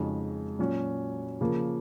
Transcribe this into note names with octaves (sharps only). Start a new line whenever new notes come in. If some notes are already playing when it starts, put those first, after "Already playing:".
Already playing: F2 C#3 G#3 D#4 F#4
A#2 F#3 C#4 F#4
C#3 F3 A#3